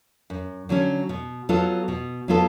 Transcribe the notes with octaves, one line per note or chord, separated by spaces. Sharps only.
F#2
D3 F#3 C#4
B2
F#3 B3 F4 A4
B2
F#3 B3 F4 A4